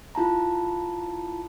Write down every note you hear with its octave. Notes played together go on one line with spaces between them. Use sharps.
E4 F4 A5 A#5